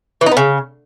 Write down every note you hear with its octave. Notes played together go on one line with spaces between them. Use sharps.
E3
D#4
B3
C#3